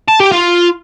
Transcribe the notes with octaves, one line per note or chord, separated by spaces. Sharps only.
A5
G4
F4